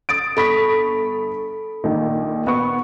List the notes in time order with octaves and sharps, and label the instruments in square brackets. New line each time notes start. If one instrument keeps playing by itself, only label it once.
[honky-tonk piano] D#6 A6 D7
[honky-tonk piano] G1 C#6 B6 [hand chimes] A4 B5
[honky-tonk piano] A#1 A#2 D#3
B3 C#6